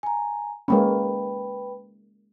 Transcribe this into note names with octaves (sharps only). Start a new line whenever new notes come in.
G#5 A#5
G#3 A#3 C#4 B4 G5 B5